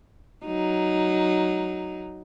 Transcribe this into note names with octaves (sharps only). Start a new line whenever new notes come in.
F#3 D#4